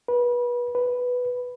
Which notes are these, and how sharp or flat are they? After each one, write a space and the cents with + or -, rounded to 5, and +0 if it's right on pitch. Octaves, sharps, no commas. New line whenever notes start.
B4 -30
B4 +0